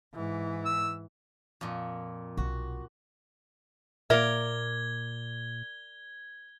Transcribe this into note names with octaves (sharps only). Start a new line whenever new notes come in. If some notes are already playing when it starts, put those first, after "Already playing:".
G#2 E3
E6
F2 A#2
B1 F#4
A#2 A#3 A#4 D5 E5 G#6 G7